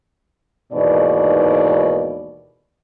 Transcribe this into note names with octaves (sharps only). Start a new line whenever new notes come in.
D#2 G#2 B2 E3 D5